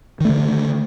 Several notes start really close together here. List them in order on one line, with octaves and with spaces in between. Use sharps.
D#3 A3 D3